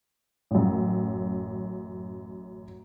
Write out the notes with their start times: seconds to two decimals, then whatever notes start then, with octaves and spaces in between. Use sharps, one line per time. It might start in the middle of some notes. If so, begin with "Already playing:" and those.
0.51 A1 F#2